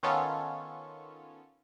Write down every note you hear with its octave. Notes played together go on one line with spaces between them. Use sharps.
D#3 B3 C#4 F4 A4 C#5